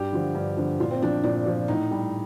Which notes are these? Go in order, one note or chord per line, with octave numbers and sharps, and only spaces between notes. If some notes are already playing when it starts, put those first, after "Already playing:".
Already playing: G2 G4
D3 F3
G2
D3 F3
A#2 F4
C4
F3 D4
A#2 D4
F3
A2 D#4
G3